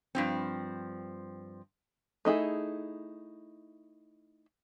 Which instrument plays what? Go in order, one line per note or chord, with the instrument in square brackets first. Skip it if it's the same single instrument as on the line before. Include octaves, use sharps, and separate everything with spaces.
[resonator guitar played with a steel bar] G2 F3 C4
[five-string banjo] A3 D#4 E4 G#4